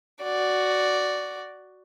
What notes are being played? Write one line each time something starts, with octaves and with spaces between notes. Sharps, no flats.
F#4 D5